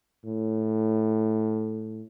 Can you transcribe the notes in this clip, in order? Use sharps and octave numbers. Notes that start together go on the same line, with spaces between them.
A2